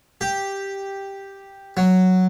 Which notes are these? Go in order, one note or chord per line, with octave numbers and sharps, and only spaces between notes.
G4
F#3